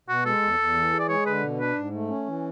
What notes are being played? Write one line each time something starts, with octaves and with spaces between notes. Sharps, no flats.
B2 F#4
G#3 A4
E2
E2
E3
G#4
D5
G#3 C#5
D3 B4
B2
D4 B4
G#2
A3
C#4
E3